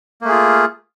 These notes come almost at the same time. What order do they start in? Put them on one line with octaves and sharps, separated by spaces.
A#3 A3 G#4 F4